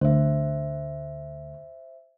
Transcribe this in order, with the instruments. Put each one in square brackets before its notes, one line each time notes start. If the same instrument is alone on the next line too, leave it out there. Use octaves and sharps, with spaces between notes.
[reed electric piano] D2 [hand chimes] C5 E5